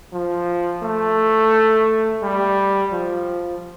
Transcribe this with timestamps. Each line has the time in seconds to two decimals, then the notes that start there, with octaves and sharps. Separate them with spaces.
0.13 F3
0.83 A3
2.23 G3
2.92 F3